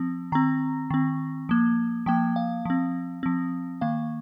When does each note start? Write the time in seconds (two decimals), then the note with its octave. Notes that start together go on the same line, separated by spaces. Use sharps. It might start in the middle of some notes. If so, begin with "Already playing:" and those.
Already playing: F3 C4
0.32 D#3 C4 A#5
0.90 D#3 C4
1.49 F3 A#3
2.06 F3 A#3 G5
2.36 F5
2.65 F3 C4
3.23 F3 C4
3.81 D#3 A#3 F5